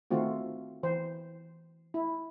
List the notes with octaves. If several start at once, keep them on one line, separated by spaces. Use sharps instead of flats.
D#3 A3 C4 F4 F#4
E3 C5
E4